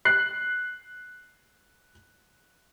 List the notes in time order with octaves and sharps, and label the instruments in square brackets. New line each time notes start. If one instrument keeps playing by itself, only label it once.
[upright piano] F#6 C7